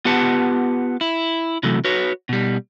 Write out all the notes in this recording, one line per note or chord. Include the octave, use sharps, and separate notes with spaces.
B3 F4 G4 B4 F#5 A5
E4
C3 E3 F#3 A3
F#4 B4 C#5
B2 G3